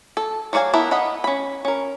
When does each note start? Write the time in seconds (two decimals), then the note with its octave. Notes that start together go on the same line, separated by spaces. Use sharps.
0.17 A4
0.53 F#3 F#4 D5 F5 G#5
0.73 B3 E4 A#4 E5 A5
0.91 B3 D#5 F#5 B5
1.24 C#4 B5
1.65 C#4 A#4